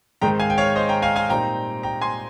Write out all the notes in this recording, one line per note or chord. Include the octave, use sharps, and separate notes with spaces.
G#2 D#3 G#3 C4 D#4 G5 A#5
F5 G#5
G5
C#5 F5
C5 D#5
G5 A#5
F5 G#5
F5 G#5
A#2 G3 C4 D#4 G5 A#5
G5 A#5
G#5 C6